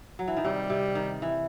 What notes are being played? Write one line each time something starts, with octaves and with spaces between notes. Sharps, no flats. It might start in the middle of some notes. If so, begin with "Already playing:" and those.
F#3
E3
D#3
C3 G3
C3
D#3
E3